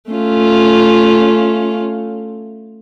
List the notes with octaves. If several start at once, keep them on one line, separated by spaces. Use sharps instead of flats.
A3 C#4 F4